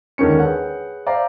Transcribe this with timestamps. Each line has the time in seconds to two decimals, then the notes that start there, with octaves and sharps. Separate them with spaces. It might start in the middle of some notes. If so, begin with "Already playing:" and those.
0.18 D#2 D3 D#3 G#3 C#4 C#7
0.38 G#4 B4 C#5 F#5 G5
1.06 C5 D5 E5 F5 G5 A#5